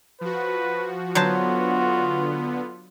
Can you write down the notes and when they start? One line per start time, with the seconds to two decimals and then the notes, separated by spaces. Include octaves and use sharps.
0.21 F3 F#4 B4
1.15 D3 F#3 B3 F4 F#4 C5 A5